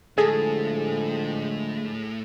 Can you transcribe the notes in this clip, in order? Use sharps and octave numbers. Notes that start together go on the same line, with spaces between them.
A2 D3 F3 G#3 G#4 A4